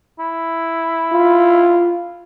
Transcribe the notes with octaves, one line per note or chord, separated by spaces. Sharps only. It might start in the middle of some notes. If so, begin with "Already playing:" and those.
E4
F4